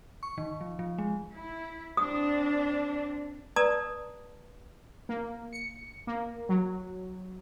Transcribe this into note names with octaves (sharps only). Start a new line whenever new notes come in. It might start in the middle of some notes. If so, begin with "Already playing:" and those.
C#6
D#3
F3
F3
G#3
E4
C4 D4 D#6
B4 D5 A5 A#5 D#6
A#3
C#7
A#3
F#3